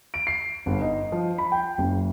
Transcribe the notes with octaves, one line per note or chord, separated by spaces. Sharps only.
D7
C7
G1
D#4
F3
B5
G5
F#1